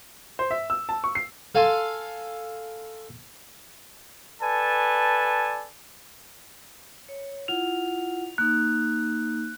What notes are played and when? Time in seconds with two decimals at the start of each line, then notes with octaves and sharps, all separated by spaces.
0.39 C5
0.51 E5
0.70 E6
0.89 A5
1.04 C#6
1.15 C7
1.55 A4 F5 G#5 A5 C6
4.42 A4 B4 D5 G#5 A5
7.09 C#5
7.48 E4 F4 F#5 F7
8.38 A#3 D#4 F#6